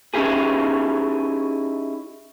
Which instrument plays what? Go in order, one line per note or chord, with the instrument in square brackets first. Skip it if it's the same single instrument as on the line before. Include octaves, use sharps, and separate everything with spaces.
[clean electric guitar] C#4 D#4 E4 G4 G#4